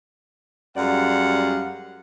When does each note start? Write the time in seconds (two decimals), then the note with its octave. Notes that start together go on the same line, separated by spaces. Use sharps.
0.77 F#2 G3 G#3 D5 F5 F#5